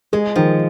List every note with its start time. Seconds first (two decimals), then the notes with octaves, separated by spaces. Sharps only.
0.13 G#3 G#4
0.36 D#3 F3